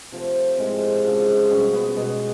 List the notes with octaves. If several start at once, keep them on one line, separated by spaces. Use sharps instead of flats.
C3 F3 A3
A2 F3 G#3 C4
C#3 F3 G#3
B2 G3 C#4
B3
B2 G#3